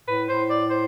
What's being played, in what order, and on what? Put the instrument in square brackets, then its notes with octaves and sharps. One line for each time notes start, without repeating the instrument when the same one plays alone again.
[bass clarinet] A2 [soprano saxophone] B4
[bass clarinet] A2 [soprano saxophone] C5
[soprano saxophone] D5
C5